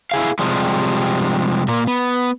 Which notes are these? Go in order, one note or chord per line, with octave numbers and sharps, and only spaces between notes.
E4 G#4 F5
C3 F3 G3 G#3
A#2 A#3
B3